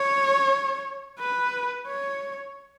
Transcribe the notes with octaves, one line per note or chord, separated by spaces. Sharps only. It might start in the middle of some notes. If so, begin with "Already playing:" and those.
Already playing: C#5
B4
C#5